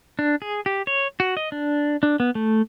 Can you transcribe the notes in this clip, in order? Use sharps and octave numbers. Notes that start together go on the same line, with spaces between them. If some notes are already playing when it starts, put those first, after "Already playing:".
D4
G#4
G4
C#5
F#4
D#5
D4
D4
B3
A3